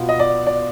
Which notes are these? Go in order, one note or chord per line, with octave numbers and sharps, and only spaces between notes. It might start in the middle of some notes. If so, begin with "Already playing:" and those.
Already playing: B2 B3 F4
D#5
D5
D5